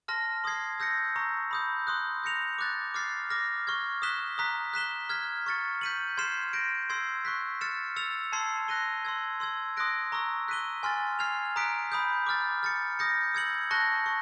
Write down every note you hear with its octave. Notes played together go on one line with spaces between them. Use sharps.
A5 C6 F6 A#6
C6 D#6 G#6 C7
E6 G6 A#6 C#7
A#5 C#6 E6
B5 D#6 G6
C6 D#6 F#6
G6 A#6 C#7 F7
D6 F#6 A6
D6 F6 A6 C7
D6 F6 A#6
C#6 F6 G#6
D#6 F#6 B6 E7 G7
A#5 D#6 F#6 B6
F#6 B6 E7 G7
F6 G#6 B6
C#6 F6 A6 C#7
G6 B6 D#7 F#7
C6 F6 G#6 C7 E7
G6 A#6 D7
C6 E6 G#6 C7
C#6 F#6 B6
F6 A6 C#7 E7
E6 A6 C#7 F7
A5 C6 E6 G#6 C7
F#6 A#6 D#7 G7
C6 E6 G#6
C6 E6 G#6
C6 D#6 F#6 A#6 D7
A#5 C#6 E6
F#6 B6 D#7 G7
G#5 C6 F6 A6
F6 G#6 C7 F7
A#5 D#6 F#6 B6 D7
B5 D#6 G6
D6 F6 A6
F6 A6 C#7
D#6 G6 A#6 C#7
E6 G#6 C#7 F#7
A5 C#6 F#6 A#6 C#7
C#6